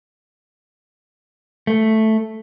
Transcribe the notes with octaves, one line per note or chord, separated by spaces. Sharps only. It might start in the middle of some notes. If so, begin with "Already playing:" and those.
A3